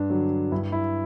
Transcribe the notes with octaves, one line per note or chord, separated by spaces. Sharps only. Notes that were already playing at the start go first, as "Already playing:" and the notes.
Already playing: G2 D4
D3 F#3
G2 E4
E4